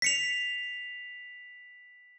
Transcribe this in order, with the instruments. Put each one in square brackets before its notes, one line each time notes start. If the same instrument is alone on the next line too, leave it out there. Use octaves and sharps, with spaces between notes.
[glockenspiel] B6 C#7 F7